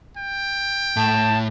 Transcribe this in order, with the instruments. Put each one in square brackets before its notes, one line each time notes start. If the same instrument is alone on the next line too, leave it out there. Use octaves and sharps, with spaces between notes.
[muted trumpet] G5
[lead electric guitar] A2 [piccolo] A5